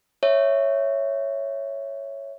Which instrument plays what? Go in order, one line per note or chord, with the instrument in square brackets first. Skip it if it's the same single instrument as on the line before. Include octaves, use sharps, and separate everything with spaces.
[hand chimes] C#5 E5